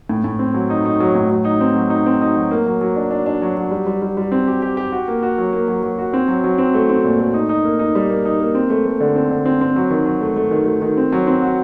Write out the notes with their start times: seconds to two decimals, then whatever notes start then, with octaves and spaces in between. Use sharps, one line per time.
0.09 A2
0.24 A2
0.39 C4
0.54 F#3
0.70 D#4
0.85 D#4
1.00 F#3
1.15 A2
1.30 F#3
1.45 D#4
1.61 C4
1.75 F#3
1.90 D#4
2.06 C4
2.21 D#4
2.36 F#3
2.51 A#3
2.66 F#3
2.81 F#3
2.96 D4
3.11 D4
3.26 D4
3.42 F#3
3.57 F#3
3.71 G3
3.87 G3
4.02 G3
4.17 G3
4.32 C4
4.47 G4
4.62 G4
4.77 G4
4.92 F#4
5.08 A#3
5.23 F#4
5.38 F#3
5.53 A#3
5.68 F#3
5.83 F#3
5.98 F#4
6.13 C4
6.28 F#3
6.44 F#3
6.58 C4
6.74 A3
6.89 C4
7.04 A#2
7.19 A3
7.34 D#4
7.49 D#4
7.65 A#3
7.79 D#4
7.95 G3
8.10 A#3
8.25 D#4
8.40 A#3
8.55 C4
8.70 A3
8.86 A3
9.00 D3
9.16 C4
9.30 D3
9.45 C4
9.61 C4
9.76 F#3
9.91 D#3
10.06 F#3
10.21 A3
10.36 A3
10.51 D#3
10.66 A3
10.82 D#3
10.97 C4
11.12 F#3
11.27 C4
11.42 F#4